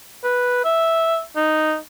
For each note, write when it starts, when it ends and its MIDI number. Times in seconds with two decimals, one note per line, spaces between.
0.24 0.61 71
0.65 1.21 76
1.37 1.76 63